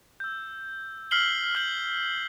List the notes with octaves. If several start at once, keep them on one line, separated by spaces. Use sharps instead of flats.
E6 G6
E6 F6 B6 C7 F#7 G7
F6 G6 F#7